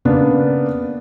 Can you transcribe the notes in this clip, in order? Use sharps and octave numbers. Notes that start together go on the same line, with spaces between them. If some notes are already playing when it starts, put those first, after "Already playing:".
C#3 A#3 B3 D4